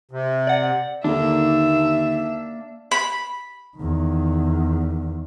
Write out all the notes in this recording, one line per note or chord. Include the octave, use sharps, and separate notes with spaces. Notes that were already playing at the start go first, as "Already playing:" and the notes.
C3
D5 F#5
D#2 D3 A#3 D4 D#4 A4 E5
B5
E2 D#3